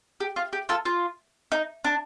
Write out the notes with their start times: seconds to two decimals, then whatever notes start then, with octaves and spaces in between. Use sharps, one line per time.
0.20 G4
0.36 F4
0.53 G4
0.69 F4 A4
0.85 F4
1.52 D#4
1.84 D4